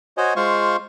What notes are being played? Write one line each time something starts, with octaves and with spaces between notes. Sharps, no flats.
F#4 C5 C#5 D#5 G#5
G#3 F4 C5 F5 C6 C#6